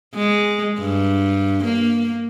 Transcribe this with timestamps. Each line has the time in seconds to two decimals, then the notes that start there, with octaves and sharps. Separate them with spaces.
0.15 G#3
0.79 G2
1.64 A#3